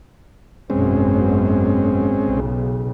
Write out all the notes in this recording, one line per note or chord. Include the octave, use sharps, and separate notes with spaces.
G#1 F#2 B2 G#3 C4 C#4
B1 C#3